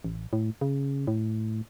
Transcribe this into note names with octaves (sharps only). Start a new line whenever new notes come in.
A1
A2
C#3
A2